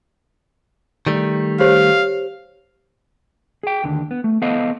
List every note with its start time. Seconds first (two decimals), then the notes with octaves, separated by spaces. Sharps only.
1.07 D#3 G3 A3
1.60 G4 C5 C#5 F5
3.63 G#4 G5
3.84 D#2 D3
4.11 B3
4.24 A3
4.42 B3 A4 C5 D#5 F5